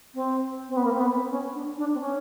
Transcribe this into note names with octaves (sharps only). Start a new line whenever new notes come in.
C4
C4
B3
A#3
C4
B3
C4
C#4
D4
D4
C4
C#4